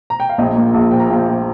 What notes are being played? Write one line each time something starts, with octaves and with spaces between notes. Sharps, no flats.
A#5
G5
F5
A#1 D#5
A#2
A#1
F3 G5
A#5
G5
A#1 F5
G5
F3